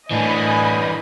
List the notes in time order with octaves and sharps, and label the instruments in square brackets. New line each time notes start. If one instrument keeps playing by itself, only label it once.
[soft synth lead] A2 [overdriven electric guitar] E3 D4 [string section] D#5 G#5 B5